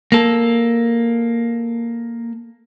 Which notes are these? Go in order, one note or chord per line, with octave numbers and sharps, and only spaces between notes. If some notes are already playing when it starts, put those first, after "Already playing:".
A#3 A4